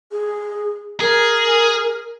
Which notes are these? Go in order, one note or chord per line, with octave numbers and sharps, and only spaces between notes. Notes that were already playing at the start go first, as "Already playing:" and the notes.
G#4
G#4 A#4